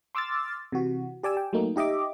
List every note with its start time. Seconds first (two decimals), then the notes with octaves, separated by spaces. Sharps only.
0.15 C6 D6 E6 F6 A6
0.72 C3 E3 F#4
1.23 G4 D5 G#5 E6
1.37 G5
1.53 F#3 A3 A#3 D#4
1.76 D#4 G4 D#5 E5 D6